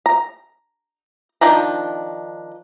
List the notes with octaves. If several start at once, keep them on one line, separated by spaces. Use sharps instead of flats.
A#5
D#3 F3 D4 A#5